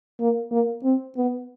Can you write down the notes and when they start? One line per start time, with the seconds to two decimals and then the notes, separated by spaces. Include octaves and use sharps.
0.20 A#3
0.52 A#3
0.84 C4
1.17 B3